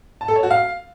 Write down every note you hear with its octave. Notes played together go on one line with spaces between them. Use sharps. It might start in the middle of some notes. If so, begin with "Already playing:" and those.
A5
A4
C#5
F#4
F5